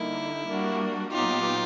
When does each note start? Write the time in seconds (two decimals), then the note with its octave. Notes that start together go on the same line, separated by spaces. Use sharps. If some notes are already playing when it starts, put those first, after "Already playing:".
Already playing: D3 G3 A#3 D#4 E4
0.47 G3 A#3 D4 F#4
1.12 A#2 F#3 B3 D#4 F4 G4